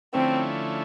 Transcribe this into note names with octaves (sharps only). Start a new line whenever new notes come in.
D3 F3 A3 C4 C#4 E4